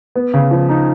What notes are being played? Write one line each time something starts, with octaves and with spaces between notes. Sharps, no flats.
B3
C#3
F3
D#4